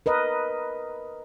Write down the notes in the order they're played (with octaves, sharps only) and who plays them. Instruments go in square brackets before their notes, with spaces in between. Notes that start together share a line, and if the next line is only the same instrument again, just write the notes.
[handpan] A#4 B4 D#5